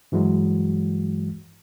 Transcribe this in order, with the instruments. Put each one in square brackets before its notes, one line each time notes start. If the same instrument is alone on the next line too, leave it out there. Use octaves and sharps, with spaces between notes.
[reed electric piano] G2 E3 F#3 G#3 F#4